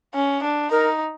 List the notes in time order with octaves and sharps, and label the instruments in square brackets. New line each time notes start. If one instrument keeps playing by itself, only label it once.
[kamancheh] C#4
D4
[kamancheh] D#4 [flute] A#4